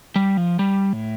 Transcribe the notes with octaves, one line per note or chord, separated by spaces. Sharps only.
G3
F3
G3
A2